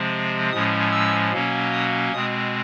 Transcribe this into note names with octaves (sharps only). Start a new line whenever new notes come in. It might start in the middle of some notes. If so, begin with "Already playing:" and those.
Already playing: C3 F3 G#3 C4
A2 F3 G#3 C#4 D#6
E6
B2 F#3 A#3 C#4
D#6
B2 G#3 C4 D#6